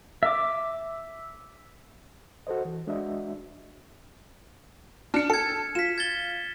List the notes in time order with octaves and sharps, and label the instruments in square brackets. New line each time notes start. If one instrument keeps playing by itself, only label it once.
[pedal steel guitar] E5 D6
[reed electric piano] F#4 A4 C5 D#5
E3
G#3 D4 F#4 D#5 E5
[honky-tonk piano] D4 C#7 [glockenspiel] F6
[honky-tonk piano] A4 [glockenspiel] G#6 C#7
[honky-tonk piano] F4 [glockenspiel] B6 E7
[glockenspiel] G#6 A6 G7